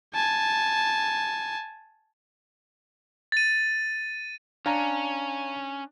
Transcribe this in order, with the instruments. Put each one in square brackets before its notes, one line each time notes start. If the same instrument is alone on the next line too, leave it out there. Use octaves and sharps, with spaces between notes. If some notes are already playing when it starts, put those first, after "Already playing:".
[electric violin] G#5 A5
[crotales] A6 D#7
[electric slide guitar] C#4 [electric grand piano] D4 [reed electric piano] F5 G#5 A#5